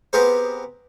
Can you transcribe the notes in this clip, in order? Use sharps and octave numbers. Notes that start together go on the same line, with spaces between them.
B3 C4 G4 G#4 A#4 C5